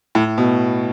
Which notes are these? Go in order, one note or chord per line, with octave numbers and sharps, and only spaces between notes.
A2
B2